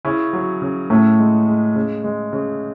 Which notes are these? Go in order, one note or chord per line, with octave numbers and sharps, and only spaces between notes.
C#3 C#4 E4
F#3
C#3
A2 A3 C#4
G#3
G#3
C#3
G#3
C#3